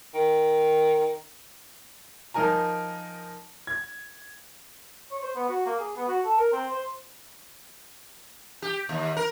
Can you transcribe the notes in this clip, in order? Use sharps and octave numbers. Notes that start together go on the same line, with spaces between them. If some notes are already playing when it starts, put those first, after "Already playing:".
D#3
F3 D#4 A#4 G#5 A#5
G#6
C#5
C5
B3
F#4
A#3
G#4
B3
F#4
A4
A#4
C4
C5
G4
D#2
A#4